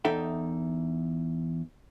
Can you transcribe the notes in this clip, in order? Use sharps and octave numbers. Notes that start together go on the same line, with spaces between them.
E2 D#4 A4 E5 G5